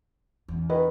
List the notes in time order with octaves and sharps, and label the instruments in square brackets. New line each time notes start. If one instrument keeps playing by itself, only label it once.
[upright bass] E2 C#4
[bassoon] D#3 [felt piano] B4